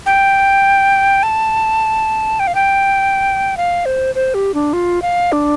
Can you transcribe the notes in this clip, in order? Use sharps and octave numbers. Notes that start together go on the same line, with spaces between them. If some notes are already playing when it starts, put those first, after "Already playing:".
G5
A5
G5
F5
G5
F5
C5
C5
G4
D4
F4
F5
D4